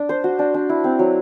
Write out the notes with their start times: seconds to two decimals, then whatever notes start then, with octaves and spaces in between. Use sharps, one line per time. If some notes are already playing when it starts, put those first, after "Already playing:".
Already playing: D4
0.09 C5
0.24 F#4
0.39 D4
0.54 D4
0.69 E4
0.84 C4
0.99 F#3